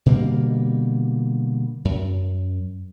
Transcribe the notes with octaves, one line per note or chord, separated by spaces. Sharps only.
B2 D3 G3 A#3
F#2